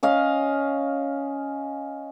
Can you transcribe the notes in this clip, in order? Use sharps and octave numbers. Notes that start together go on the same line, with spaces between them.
C#4 D#5 F5